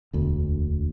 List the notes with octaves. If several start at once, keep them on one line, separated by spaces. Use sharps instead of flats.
E1 D2